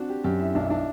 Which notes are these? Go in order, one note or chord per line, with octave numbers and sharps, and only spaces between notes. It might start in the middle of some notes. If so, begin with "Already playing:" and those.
Already playing: C4 D4 F#4
G4
F#2 G4
E4
B1 D4
E4
D4